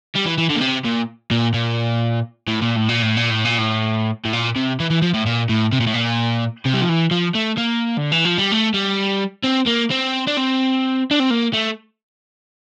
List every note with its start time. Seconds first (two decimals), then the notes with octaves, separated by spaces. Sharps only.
0.15 G3
0.26 E3
0.38 E3
0.50 D3
0.56 A#2
0.61 C3
0.85 A#2
1.31 A#2
1.54 A#2
2.47 A2
2.61 A#2
2.76 A2
2.89 A#2
3.02 A2
3.17 A#2
3.30 A2
3.45 A#2
3.58 A2
4.25 A2
4.33 A#2
4.56 C3
4.80 E3
4.90 E3
5.02 F3
5.14 A2
5.26 A#2
5.49 A2
5.72 C3
5.80 A#2
5.87 A2
5.94 A#2
6.65 C3
6.73 G3
6.81 F3
6.89 E3
7.11 F3
7.35 A3
7.58 A#3
7.98 D3
8.12 E3
8.25 F3
8.38 G3
8.52 A3
8.74 G3
9.44 C4
9.67 A#3
9.91 C4
10.28 D4
10.38 C4
11.11 D4
11.20 C4
11.31 A#3
11.53 A3